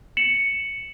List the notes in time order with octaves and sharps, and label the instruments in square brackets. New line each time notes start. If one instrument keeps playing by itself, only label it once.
[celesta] C#7 E7 F#7